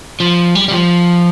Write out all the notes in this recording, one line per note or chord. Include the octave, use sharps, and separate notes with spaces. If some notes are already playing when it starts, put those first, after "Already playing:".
F3
G3
G3
F3